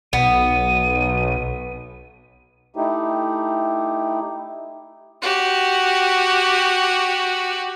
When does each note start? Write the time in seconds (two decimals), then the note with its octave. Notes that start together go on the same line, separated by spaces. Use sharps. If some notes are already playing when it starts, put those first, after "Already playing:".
0.13 B1 B3 D#7
2.76 A3 D#4 E4 G4
5.22 F#4 G4